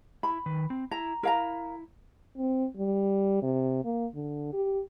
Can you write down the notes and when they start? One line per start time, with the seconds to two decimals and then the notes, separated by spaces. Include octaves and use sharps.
0.23 E4 B5
0.46 D#3 B4
0.70 C4
0.91 E4 A#5
1.23 E4 A#4 F5 A#5
2.38 C4
2.77 G3
3.42 C3
3.85 A#3
4.15 D3
4.53 G4